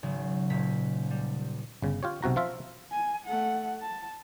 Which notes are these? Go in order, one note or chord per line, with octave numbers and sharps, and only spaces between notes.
G#1 C#3 F#3
D#1 A#2 B6
G3
G1 C#3
F4 G4 C#5
B1 C3 F#4 A#5
F3 F4 E5
G#5
A3 F#5
A5